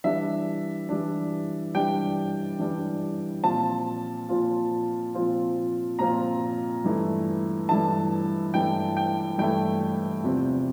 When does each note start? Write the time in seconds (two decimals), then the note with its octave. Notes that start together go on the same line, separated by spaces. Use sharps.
0.04 E3 G3 D4 E5
0.89 E3 G3 D4
1.75 E3 G3 D4 G5
2.59 E3 G3 D4
3.43 A#2 F3 C4 F4 A5
4.29 A#2 F3 C4 F4
5.15 A#2 F3 C4 F4
5.99 A#2 F3 C4 F4 A#5
6.84 G2 E3 A3 E4
7.69 G2 E3 A3 E4 A5
8.54 G2 E3 A3 E4 G5
8.97 G5
9.38 G2 E3 A3 E4 G5
10.24 E2 C3 F3 C4